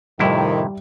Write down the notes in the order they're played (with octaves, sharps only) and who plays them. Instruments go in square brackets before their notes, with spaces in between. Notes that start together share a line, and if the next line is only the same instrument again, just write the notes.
[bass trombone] F2 [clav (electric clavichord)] A2 C3 E4 [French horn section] D#3 [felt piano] G3